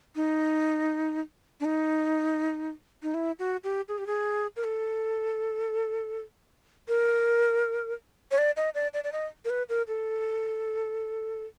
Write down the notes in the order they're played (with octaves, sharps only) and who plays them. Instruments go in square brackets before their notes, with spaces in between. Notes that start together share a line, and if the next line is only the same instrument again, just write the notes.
[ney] D#4
D4
D#4
D#4
E4
F#4
G4
G#4
G4
G#4
A#4
A4
A#4
C#5
D5
D#5
D5
D5
D5
D#5
A#4
B4
A#4
A4